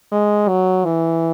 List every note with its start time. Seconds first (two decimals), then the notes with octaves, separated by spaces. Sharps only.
0.12 G#3
0.48 F#3
0.85 E3